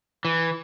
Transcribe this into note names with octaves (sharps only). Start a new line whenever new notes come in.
E3